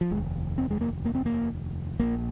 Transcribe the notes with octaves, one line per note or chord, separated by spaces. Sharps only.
F3
F1 D#2 G#3
C4
G#3
A#3
A#3
C4
A#3
A#1 A#2 A#3